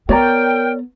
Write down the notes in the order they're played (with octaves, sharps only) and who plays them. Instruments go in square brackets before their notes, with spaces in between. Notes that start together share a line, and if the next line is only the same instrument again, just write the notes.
[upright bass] B3 [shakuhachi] A#4 [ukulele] C#5 D5 A#5 [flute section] G5